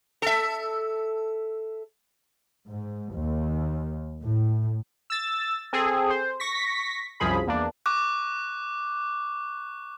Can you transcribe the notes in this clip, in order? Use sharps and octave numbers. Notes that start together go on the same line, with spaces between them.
A4 E5
G#2
D#2
A2
E6 A6
C4 G#4 A4
C5
C#6 A#6 B6
C2 F#2 F3 G#4 B5
E2 A#3 D4
C#6 D6 F#6